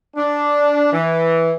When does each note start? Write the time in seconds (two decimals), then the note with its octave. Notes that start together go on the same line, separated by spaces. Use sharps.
0.16 D4
0.92 E3